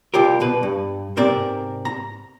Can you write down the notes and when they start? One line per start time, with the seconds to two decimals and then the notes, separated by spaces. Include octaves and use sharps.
0.14 C2 F4 G4 A#4
0.40 C2 B2 B4
0.63 G2
1.17 G#2 C3 A#4 D5
1.85 A#5